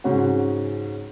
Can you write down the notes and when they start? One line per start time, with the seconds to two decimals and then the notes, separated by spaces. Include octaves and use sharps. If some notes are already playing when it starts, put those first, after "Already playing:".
0.04 G#2 C#3 C#4 F#4